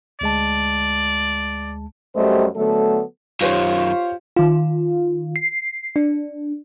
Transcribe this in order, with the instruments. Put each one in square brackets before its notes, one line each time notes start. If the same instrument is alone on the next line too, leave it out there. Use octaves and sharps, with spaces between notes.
[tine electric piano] D2 G#3 A5 [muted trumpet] D5
[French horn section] F#2 G3 A3 G4 C5 D#5
D3 F#3 A3 B3 A4
[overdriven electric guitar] F#2 D#3 [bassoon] F4 [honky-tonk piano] G4 C5 C#5
[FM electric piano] D#3 F4
C7
D4